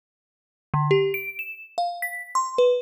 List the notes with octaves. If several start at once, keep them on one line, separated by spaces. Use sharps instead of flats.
D3
G4
D7
E7
F5
B6
C6
B4